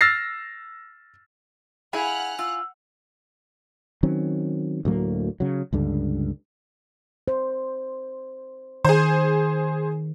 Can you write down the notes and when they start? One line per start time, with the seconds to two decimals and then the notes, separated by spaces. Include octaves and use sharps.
0.01 E6 F6 A6 A#6 C7
1.93 E4 G#4 F5 F#5 G#5 B5 F6 F#6
2.39 F4 F5 E6
4.03 D#3 F#3 C4 C#4
4.85 D2 A2 F#3 A#3
5.40 C#3 F#3
5.73 C#2 G2 D3
7.28 C5
8.85 D#3 G#4 C5